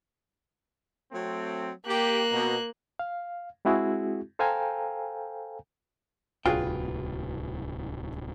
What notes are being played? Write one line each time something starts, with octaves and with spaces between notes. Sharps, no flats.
F#3 A3 C4
A#3 G4 F#6
B2 A#5
F5
G#3 C4 E4 F#4 G#4
A4 C5 F5 G5 G#5 A#5
D1 C2 F4 F#4 G#4 B4 G5